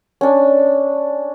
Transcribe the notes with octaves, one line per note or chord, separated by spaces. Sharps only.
C#4 D4